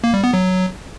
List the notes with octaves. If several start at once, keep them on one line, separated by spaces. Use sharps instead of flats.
A#3
G3
B3
F#3